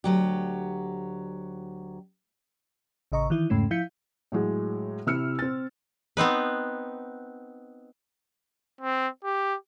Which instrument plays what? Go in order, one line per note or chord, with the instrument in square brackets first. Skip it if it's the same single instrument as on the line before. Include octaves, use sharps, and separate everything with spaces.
[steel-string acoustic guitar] D2 F#3 G4
[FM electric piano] A1 C#3 D#5 A#5 C#6
D#3 E3 E4
E2 G#2 C#3 A3 C#4
F3 E4 F5 G6 B6 C#7
[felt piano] A2 F#3 G#3
C3 E4 E6 F6 C#7
C4 A6
[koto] B3 C4 D#4 B4
[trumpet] C4
G4